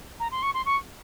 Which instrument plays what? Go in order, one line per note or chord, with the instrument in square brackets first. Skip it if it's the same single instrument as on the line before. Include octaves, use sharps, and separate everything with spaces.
[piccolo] A#5
C6
C#6
C6
C#6